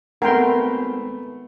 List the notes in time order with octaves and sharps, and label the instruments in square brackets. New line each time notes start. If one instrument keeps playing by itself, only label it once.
[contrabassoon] G#1 [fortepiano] A3 B3 [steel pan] A#4 G5 C6 [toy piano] F#5